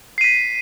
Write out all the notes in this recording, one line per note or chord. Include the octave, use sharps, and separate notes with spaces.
B6 C7 D#7